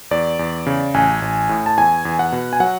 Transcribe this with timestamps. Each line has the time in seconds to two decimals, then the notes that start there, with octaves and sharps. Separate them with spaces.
0.11 E2 D5
0.39 E2
0.66 C#3
0.94 A1 G#5
1.22 A1
1.49 A2
1.66 A5
1.78 E2 G#5
2.05 E2
2.19 F#5
2.32 B2
2.53 G#5
2.60 F#3 F#5